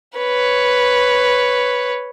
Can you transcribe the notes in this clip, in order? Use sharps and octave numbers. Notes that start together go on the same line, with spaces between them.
B4 C#5